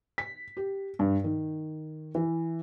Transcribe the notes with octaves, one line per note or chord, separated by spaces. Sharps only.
B6
G4
G2
D#3
E3